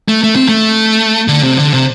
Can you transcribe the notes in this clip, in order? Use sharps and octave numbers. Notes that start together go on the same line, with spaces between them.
A3
A3
C4
A3
D3
C3
D3
C3